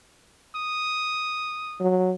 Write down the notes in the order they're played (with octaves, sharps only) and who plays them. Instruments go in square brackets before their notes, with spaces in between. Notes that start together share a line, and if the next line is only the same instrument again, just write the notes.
[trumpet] D#6
[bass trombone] F#3